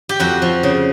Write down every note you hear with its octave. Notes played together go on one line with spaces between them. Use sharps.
G4
F2 F#4
F3
C#3